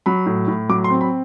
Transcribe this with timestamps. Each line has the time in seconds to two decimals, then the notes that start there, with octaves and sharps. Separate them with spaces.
0.06 F#3 B5
0.26 A2
0.48 A2
0.69 F#3 D6
0.84 C6
0.90 C4
1.01 B5